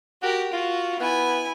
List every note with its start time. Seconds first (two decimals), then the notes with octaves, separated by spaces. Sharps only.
0.23 F#4 G4 A#4
0.53 F4 F#4
1.00 B3 E4 G#5